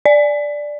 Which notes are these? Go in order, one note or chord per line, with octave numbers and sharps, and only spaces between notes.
D5